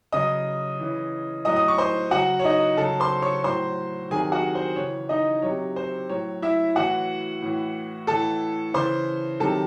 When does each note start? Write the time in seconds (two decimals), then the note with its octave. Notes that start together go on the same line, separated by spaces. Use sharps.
0.12 C#3 F#3 D#5 D#6
0.80 C#3 E3
1.45 A2 F#3 D#5 D#6
1.56 D#6
1.68 C#6
1.78 C5 C6
2.11 C#3 F#3 F#4 F#5
2.39 C#5
2.44 D#4 D#5
2.77 C#3 F#3 A4 A5
3.00 C5 C6
3.22 C#5 C#6
3.44 A2 F#3 C5 C6
4.10 C3 D#3 F#3 G#4 G#5
4.22 G#5
4.32 F#4 F#5
4.55 C5
4.76 C#3 E3 C#5
5.09 D#4 D#5
5.42 C3 F#3 C#5
5.76 C5
6.09 A2 F#3 C#5
6.42 E4 E5
6.75 A2 E3 F#4 F#5
7.42 A2 E3
8.07 A2 E3 A4 A5
8.74 C#3 E3 C5 C6
9.40 C3 D#3 F#3 A4 A5